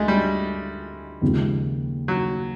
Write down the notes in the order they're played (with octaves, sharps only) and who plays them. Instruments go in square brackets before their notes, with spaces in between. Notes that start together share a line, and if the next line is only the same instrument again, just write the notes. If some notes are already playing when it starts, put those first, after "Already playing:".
Already playing: [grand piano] D2 D3 F#3 [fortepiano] G#3 A3
[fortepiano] G3
[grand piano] D#2 C#3 F3 G#3
[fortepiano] F#3